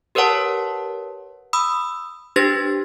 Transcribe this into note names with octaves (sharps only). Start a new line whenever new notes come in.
G4 A#4 B4 C#5 F#5 A5
B5 D#6 E6
D4 G4 B4 C5 A6 A#6